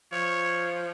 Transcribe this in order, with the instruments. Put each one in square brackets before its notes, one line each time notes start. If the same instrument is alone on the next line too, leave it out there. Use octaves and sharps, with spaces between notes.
[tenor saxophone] F3 [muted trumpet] C#5